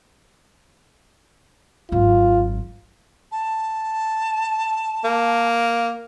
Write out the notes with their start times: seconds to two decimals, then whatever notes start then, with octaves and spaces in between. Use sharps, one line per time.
1.92 G#1 F#2 F4
3.32 A5
5.04 A#3